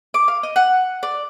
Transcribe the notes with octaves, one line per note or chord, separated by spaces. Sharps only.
D6
F5
D#5
F#5
D5